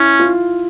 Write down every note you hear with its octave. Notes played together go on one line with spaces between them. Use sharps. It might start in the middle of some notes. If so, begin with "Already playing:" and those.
Already playing: C#4 E4
F4